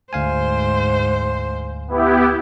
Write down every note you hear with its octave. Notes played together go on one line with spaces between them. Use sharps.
D2 G#2 C5 F5 G#5
B3 E4 G4